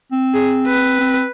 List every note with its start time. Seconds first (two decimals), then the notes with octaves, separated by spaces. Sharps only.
0.12 C4
0.34 G#4
0.67 B4
1.00 C4